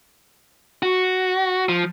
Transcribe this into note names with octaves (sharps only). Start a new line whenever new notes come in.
F#4
F3